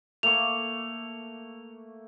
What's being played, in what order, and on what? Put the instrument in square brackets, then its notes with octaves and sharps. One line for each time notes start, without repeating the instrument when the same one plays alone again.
[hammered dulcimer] A3 A#3 C#6 [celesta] F7